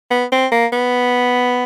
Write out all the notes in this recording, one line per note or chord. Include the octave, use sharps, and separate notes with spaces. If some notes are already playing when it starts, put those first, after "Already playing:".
B3
C4
A#3
B3